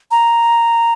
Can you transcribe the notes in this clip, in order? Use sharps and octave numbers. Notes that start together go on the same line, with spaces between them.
A#5